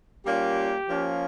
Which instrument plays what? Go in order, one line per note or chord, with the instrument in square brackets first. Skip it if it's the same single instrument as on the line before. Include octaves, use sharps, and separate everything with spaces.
[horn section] A#2 G3 A#3 C#4 F4 G4
F3 A#3 C#4